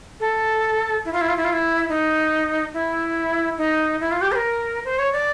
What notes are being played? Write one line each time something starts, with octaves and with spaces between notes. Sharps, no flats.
A4
E4
F4
E4
F4
E4
F4
E4
D#4
E4
D#4
E4
F4
G4
C5
A#4
C5
C#5
D5